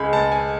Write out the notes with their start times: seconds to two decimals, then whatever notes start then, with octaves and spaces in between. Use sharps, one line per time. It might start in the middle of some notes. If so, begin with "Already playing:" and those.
Already playing: C#2 C#3 G#3 G#5 B5
0.13 C#2 A5
0.32 G#5